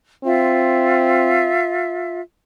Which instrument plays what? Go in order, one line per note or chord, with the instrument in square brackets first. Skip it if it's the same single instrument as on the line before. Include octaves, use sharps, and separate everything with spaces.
[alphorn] C4 [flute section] F4 E5